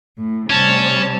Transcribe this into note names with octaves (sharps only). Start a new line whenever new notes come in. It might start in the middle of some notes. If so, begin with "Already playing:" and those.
A2
C3 G3 C#4 A5